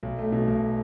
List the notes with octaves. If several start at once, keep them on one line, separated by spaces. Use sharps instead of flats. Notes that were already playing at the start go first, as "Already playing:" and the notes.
B1
A3
B2
B1